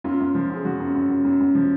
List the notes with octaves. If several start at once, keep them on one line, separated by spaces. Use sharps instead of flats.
F#2 F4
F#2
F3
F#2 G#4
F3 F#4
F#2
F#2
F#2
F#2
F#2
F3